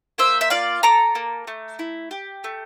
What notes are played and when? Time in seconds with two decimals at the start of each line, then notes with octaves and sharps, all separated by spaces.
0.18 A#3 C5 E5
0.41 E5
0.50 F4 D5 F5
0.83 A4 A#5 D6
1.15 A#3
1.47 A3
1.79 E4
2.11 G4
2.44 A3